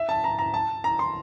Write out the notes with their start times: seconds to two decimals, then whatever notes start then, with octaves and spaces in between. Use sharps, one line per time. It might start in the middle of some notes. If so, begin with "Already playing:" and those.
Already playing: E5
0.09 A5
0.24 A#5
0.39 A#5
0.54 A5
0.84 A#5
0.99 C6